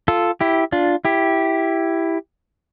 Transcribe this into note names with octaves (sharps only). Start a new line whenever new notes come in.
F4 A4
E4 G4
D4 F4
E4 G4